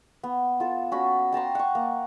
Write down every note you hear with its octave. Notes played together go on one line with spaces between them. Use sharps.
B3
F4 A4
C#4 F#4 B5
G5 A5 A#5 C6
F#5 C#6
A#3